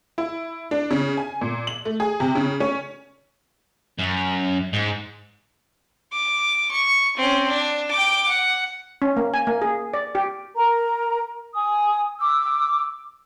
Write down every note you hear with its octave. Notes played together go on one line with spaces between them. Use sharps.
E4
D4
C#3
G#5
A#2
F#7
A3
G#4
C3
C#3
C#4
F#2
G#2
D6
C#6
C4 C#4
D4
G5 D6
F#5
C#4
A#3
G#5
A#3
G#4
D5
G4
A#4 A#5
G#5 D#6
D6 E6